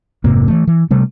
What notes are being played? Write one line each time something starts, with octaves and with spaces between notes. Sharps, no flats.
F1 G#2 C3 A#3
E3 F#3 A3
E3
C3 G3 A3